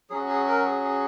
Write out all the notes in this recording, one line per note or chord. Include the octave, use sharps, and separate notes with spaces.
F#3 C#4 F#4 G#4
G#4
A#4
G#4
G#4